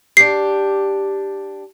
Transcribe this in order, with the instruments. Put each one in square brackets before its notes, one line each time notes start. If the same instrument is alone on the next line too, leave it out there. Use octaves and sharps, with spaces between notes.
[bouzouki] D4 G4 [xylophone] C7